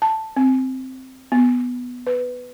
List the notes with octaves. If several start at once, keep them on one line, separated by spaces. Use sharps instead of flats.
A5
C4
B3
B4